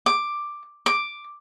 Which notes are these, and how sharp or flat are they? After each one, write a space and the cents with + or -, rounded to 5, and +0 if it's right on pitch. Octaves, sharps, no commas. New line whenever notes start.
D6 +5
D6 +5